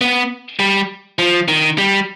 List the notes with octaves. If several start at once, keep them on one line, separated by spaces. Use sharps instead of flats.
B3
G3
F3
D#3
G3